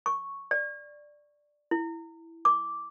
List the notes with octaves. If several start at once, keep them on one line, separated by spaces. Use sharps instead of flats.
C#6
D5
E4
D6